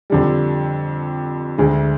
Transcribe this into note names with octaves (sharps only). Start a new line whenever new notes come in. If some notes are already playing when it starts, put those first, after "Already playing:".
F2 D3 G3
D2 D3 G#3